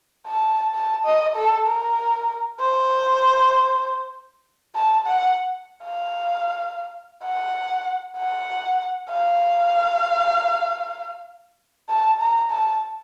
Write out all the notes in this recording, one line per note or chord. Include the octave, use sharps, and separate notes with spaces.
A5
A5
D#5
A4
A#4
C5
A5
F#5
F5
F#5
F#5
F5
A5
A#5
A5